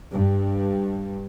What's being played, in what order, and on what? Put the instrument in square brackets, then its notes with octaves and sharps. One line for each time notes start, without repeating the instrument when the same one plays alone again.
[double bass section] G2